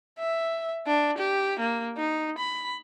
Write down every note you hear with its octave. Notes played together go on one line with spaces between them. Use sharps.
E5
D4
G4
A#3
D#4
B5